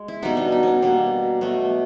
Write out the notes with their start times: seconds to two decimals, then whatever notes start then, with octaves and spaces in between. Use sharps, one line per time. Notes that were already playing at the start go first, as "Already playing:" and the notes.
Already playing: G#3
0.08 E4
0.22 B2 G3 B3 D#4
0.37 D4
0.52 D#4
0.63 C#4 D4
0.82 B2 G3 A#3
1.41 B2 F#3 A3